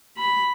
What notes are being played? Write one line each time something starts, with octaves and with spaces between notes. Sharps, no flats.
B5